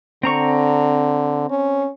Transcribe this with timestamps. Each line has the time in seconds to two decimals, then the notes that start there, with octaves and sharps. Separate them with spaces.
0.23 D3 C4 A#5 C#6
1.50 C#4